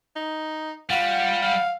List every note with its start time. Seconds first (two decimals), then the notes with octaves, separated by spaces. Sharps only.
0.16 D#4
0.90 G3 F4 F#5
1.42 F5